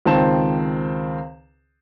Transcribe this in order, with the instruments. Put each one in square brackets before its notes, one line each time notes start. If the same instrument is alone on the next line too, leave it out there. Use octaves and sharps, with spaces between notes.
[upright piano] C#2 D#3 C4 C5 A5 E7